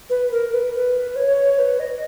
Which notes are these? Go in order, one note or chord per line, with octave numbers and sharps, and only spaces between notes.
B4
A#4
B4
B4
C#5
B4
D#5